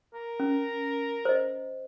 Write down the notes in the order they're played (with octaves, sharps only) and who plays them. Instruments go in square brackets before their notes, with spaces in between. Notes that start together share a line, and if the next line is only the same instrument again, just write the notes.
[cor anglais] A#4
[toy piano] C#4
C5 D#5